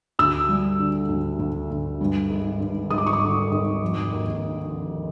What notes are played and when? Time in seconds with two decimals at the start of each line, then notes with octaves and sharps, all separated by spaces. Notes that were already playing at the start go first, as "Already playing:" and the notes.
0.19 D2 E6
0.49 G3
0.80 D3
1.09 D2
1.39 D2
1.71 D2
2.01 G2
2.30 G#1
2.61 G#1
2.90 G#1 D#6
2.98 D6
3.06 C#6
3.13 D6
3.22 D3
3.52 G#1
3.81 F1
4.13 D#2